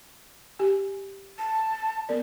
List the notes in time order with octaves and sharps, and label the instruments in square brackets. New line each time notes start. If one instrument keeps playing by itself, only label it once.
[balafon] G4 G#5
[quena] A5
[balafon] B3 A#4 D5